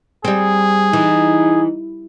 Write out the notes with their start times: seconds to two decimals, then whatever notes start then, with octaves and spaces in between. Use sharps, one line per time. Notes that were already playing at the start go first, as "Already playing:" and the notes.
0.25 G3 C4 G#4
0.93 E3 D#4